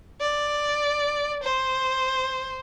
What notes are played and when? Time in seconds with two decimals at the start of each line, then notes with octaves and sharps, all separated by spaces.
0.20 D5
1.43 C5